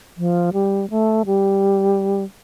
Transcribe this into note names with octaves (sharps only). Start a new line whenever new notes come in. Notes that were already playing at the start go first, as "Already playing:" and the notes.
F3
G3
A3
G3